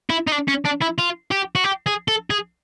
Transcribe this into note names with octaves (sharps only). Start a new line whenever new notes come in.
E4
D#4
D4
C#4
D4
E4
F4
G4
F#4
G4
G#4
A4
G#4